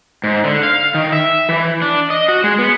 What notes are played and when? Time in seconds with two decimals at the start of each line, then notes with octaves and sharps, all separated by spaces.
0.24 G#2
0.44 D3
0.63 F5
0.94 D#3
1.12 E5
1.49 E3
1.82 D4
2.10 D#5
2.28 F#4
2.44 G#3
2.59 B3